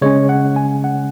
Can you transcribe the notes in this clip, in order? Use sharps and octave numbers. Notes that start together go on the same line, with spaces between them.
C#3 G#3 C#4 C#5
F#5
G#5
F#5